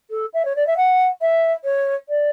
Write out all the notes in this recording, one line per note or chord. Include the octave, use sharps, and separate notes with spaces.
A4
E5
C#5
D5
E5
F#5
E5
C#5
D5